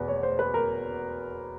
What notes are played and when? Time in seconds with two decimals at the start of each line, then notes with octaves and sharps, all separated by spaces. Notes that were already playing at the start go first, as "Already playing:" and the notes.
Already playing: E2 B2 B4
0.08 C#5
0.23 C5
0.39 B4
0.54 A#4